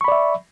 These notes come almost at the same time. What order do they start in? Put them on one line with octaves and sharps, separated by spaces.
C#6 B5 D5 E5